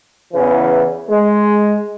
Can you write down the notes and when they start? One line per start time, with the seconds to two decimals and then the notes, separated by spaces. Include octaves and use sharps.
0.33 E2 C#3 E3
1.08 G#3